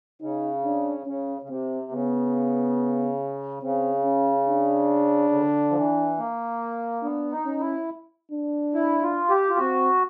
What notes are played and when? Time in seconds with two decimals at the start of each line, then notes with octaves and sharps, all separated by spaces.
0.22 C#3 D#4
0.65 D4
1.06 C#3 C#4
1.42 C#3
1.49 C3 C4
1.92 C#3 B3
3.62 C#3 C4
4.05 C#4
4.48 D4
5.33 D3
5.70 F3
5.75 E3
6.18 A#3
7.03 B3 D4
7.32 D#4
7.45 C#4
7.60 E4
8.31 D4
8.74 E4
9.03 F4
9.30 G4
9.50 F4
9.58 C4 F#4